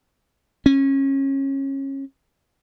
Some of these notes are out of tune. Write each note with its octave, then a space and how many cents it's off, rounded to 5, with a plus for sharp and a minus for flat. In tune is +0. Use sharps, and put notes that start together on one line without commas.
C#4 -25